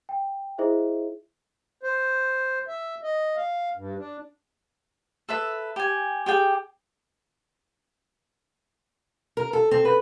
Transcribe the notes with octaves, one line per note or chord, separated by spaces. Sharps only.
G5
E4 G#4 C5 D#5 E5
C5
E5
D#5
F5
G2
D4
A4 B4 E5
G4 G#5
G4 G#4 G5
A#4
A4
C4
B4